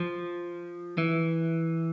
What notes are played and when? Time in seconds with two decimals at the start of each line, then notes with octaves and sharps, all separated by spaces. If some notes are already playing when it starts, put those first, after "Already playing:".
Already playing: F3
0.98 E3